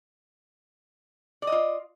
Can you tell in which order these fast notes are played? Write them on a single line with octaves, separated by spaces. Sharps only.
D5 D#5 F4